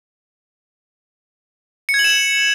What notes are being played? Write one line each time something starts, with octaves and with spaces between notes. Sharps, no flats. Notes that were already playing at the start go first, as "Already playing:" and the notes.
C#7
G#6
F#7
E7
F#7